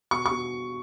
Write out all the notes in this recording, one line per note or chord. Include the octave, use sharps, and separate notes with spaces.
B2 C#6
C#6
B2